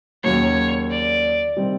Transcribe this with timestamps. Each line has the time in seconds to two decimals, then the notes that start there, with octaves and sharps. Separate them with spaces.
0.23 D#2 C#3 F#3 A#3 C#5
0.90 D5
1.57 C3 D#3 G3 C4